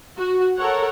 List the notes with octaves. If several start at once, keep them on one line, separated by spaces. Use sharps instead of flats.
F#4
A4 A#4 C#5 F#5